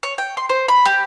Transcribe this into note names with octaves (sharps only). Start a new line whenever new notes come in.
C#5
G5
C6
C5
B5
G4